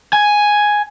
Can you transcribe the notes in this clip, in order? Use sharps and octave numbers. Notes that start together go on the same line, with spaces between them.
G#5